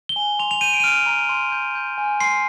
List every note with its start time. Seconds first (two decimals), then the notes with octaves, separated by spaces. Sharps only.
0.09 G7
0.16 G#5
0.39 C6 F7
0.51 F7
0.61 G6 D#7
0.74 D7
0.80 D#7
0.84 F6 D7
1.06 A#5
1.29 C6
1.52 G6
1.75 G6
1.98 G#5
2.20 C6 C7